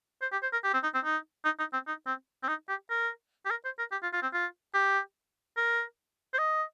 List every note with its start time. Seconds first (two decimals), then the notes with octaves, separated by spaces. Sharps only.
0.22 C5
0.32 G4
0.43 C5
0.53 A#4
0.64 G4
0.73 C4
0.83 D#4
0.94 C4
1.04 D#4
1.45 D#4
1.59 D#4
1.73 C4
1.87 D#4
2.07 C4
2.43 C4
2.48 D#4
2.68 G4
2.90 A#4
3.46 G4
3.50 A#4
3.65 C5
3.79 A#4
3.91 G4
4.03 F4
4.13 F4
4.22 C4
4.33 F4
4.74 G4
5.57 A#4
6.33 C5
6.38 D#5